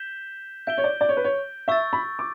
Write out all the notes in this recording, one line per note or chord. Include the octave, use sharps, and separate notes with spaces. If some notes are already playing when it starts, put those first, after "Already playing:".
Already playing: G6 B6 E7 G7
E5 G6 D7 G7
C#5
D5
D5
C#5
B4
C#5
E5 C#6 E6 A6
B5
D6